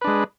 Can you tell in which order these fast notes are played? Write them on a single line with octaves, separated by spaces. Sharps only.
B4 D4 G#3